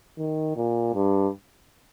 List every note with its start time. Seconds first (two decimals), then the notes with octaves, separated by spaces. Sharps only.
0.18 D#3
0.56 A#2
0.94 G2